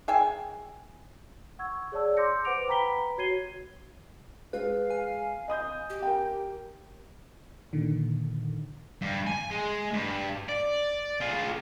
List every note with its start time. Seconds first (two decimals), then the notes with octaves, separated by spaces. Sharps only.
0.08 G#4 E5 G5 G#5
1.59 F#5 C#6 E6 G#6
1.92 G#4 C#5 D5 A5 E6
2.17 C6 D6 E6 G6 A#6 C#7
2.45 B4 C5 F#5 D6 D7 F7
2.67 B4 G5 A#5 B5 B6 G7
3.18 F#4 C#5 G#6 C7 D#7 G7
4.53 G#3 B4 F5
4.90 G#5
5.48 D#5 D#6 G6
5.90 G4
6.03 A#4 G5
7.73 A#2 D3 D#3
9.01 G2
9.27 G#5
9.51 G#3
9.93 G2
10.49 D5
11.21 F4 G#4